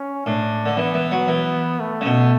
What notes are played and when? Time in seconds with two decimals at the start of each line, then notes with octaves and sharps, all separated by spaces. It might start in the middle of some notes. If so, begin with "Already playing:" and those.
Already playing: C#4
0.26 A2 D4
0.66 D3
0.77 E3 B3
0.94 E3
1.11 F#3
1.28 E3
1.80 A3
2.01 C#3
2.06 B2